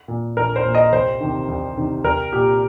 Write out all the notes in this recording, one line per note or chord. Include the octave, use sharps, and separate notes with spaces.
A#2
A#1 A#4
C5
A#2
D#5
C2 C5
C3 D#3
C2
C3 D#3
C2 A#4
A#2 G4